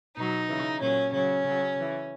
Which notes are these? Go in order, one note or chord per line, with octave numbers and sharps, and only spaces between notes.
B2 F#3 D#4
C#3 E3
A#2 F#3 C#4
C#3 F#3 C#4
C#3 F#3
C#3 E3